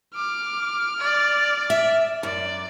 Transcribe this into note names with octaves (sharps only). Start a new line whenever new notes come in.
D6 F6
D5
E5
F#2 D5